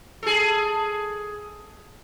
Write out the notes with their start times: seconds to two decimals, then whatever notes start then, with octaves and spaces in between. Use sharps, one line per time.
0.23 G#4 A4